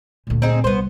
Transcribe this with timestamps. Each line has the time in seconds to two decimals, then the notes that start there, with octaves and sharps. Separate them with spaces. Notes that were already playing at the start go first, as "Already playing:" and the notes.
0.27 D2 A#2
0.42 C4 D#4 G#4
0.64 C2 B3 C5